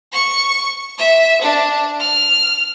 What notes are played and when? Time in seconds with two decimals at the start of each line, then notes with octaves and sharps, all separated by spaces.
0.12 C#6
0.98 E5
1.42 D4
2.00 F6